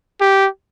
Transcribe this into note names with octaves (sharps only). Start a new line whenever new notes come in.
G4